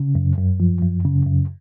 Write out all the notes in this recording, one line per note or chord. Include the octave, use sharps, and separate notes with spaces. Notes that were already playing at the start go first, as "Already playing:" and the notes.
Already playing: C#3
F#2
F#2
F3
F#2
C#3
F#2